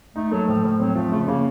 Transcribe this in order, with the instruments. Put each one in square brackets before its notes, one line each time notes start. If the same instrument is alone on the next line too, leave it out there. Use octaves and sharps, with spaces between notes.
[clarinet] A3 [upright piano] D#4
[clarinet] F#3 [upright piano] A3
[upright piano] A2 [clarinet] F3
[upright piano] A2 [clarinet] F3
[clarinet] F#3 [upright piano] C4
[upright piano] F3 [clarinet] A3
[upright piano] C#3 [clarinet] A3
[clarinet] A3
[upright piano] C#3 [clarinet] A#3